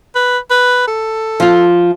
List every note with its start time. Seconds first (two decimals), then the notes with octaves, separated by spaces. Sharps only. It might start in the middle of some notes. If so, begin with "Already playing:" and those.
0.15 B4
0.50 B4
0.87 A4
1.40 F3 F4